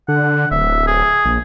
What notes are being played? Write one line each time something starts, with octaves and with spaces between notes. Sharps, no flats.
D3 F#5
D1 E5
G#4
A#1